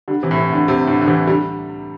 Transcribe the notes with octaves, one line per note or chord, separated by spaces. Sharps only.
D3 G3
C3 E3
A2
C3
A2 D3
C3
A2 D3
D3
C3 E3
D3 G3